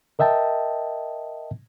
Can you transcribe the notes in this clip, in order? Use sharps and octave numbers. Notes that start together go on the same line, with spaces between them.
A#4 D#5 E5 G5 A5